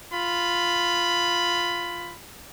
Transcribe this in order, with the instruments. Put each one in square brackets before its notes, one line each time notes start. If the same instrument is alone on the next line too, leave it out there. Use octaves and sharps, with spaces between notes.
[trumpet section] F4 B5